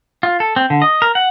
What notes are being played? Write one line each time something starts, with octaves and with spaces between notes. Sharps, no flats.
F4
A4
C4
D3
D#5
A#4
F#5